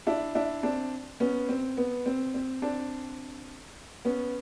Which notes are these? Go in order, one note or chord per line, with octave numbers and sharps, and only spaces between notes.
D4 E4
D4 E4
C4 D4
B3 C#4
C4
B3
C4
C4
C4 D4
B3 C#4